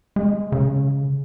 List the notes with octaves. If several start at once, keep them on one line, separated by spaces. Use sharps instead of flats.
G#3
C#3